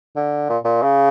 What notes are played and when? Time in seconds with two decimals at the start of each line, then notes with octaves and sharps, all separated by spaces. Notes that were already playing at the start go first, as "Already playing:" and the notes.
0.16 D3
0.49 A#2
0.64 A#2
0.82 C#3